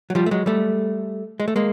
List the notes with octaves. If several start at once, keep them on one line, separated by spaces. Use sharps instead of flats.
F#3
F3 G3
A3
F#3 G#3
G3 A3
G#3
A3
G#3 A#3